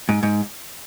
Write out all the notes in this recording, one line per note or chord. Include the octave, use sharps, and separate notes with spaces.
G#2
G#2